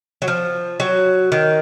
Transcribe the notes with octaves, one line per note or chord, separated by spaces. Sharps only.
F#3
F3
F#3
D#3